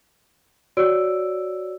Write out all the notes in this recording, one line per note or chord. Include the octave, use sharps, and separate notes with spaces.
F#4 C#5 D5 E6 D7